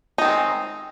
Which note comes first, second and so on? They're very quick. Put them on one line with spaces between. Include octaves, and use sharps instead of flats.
D#4 D#3 C4 G#3